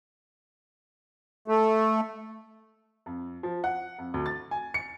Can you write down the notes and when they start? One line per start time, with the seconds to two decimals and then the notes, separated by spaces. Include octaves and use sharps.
1.48 A3
3.06 F2
3.43 F3
3.64 F#5
3.98 F2
4.14 D2
4.26 A6
4.51 G#5
4.74 C#7